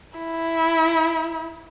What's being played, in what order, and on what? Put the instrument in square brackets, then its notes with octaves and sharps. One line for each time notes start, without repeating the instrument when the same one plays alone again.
[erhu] E4